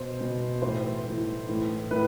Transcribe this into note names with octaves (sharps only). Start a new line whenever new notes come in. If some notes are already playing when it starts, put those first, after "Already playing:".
Already playing: B2 C5
B2
A2 E3 C5
A2 E3
A2 E3
A2 B4